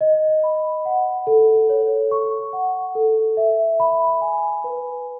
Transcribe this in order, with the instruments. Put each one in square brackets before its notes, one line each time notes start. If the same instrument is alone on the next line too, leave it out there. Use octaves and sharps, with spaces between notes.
[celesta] D#5
B5
F#5
A4
C#5
C#6
F#5
A4
E5
B5
G#5
B4